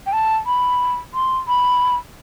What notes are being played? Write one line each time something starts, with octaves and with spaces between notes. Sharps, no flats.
G5
A5
B5
C6
B5